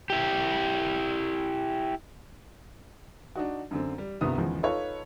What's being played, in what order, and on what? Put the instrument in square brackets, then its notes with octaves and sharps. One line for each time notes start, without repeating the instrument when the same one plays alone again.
[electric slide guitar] E4 G4
[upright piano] D4 D#4 F#4
F#2 D3 C4
G3
D#1 C2 G2 C3 B3 D#6
G#1 E2 C#3 F3
D#4 F4 A4 B4 C#5